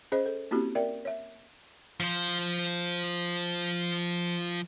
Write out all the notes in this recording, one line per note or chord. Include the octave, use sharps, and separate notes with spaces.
C#4 G#4 C5 D#5
A4
A#3 C4 C#4 E4 F#4 G4
A#4 D5 E5 G5
C#5 E5
F3 C5